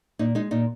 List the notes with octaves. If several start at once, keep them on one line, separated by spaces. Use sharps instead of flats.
A#2 D#4
G#3 D#4
A#2 D#4